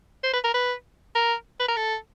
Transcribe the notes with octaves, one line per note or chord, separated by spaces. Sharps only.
C5
B4
A#4
B4
A#4
B4
A#4
A4